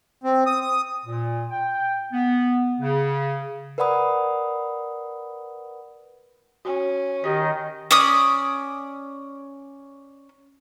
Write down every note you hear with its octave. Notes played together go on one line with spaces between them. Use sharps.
C4
D#6
D#6
A#2
G5
B3
C#3
A#4 B4 D5 F#5 B5 D#6
C#4 F#4
D#3 G4 C#5 D#5
C#4 D5 D#6